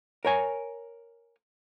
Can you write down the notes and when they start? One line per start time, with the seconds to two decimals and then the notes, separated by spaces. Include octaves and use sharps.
0.25 A#4 C#5 G#5